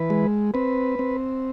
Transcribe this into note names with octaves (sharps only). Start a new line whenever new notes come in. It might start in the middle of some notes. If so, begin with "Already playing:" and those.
Already playing: E3 B4
G#3
C4 B4
C4